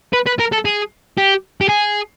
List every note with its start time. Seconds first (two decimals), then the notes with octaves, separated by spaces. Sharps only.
0.13 B4
0.27 B4
0.40 A#4
0.53 A4
0.66 G#4
1.18 G4
1.61 G4
1.69 G#4